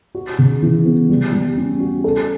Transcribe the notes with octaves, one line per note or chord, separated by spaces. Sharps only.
F#4
C#3
E3
B3
G3
G3
C#4
F#4
A4